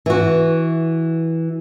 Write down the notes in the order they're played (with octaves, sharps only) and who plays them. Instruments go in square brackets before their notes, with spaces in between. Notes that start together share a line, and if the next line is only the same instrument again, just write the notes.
[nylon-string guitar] E3 F#4